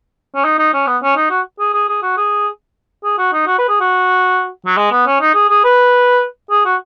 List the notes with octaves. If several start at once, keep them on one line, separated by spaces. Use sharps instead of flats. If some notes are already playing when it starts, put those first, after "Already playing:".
C#4
D#4
D#4
C#4
B3
C#4
D#4
F#4
G#4
G#4
G#4
F#4
G#4
G#4
F#4
D#4
F#4
B4
G#4
F#4
F#3
G#3
B3
C#4
D#4
G#4
G#4
B4
G#4
F#4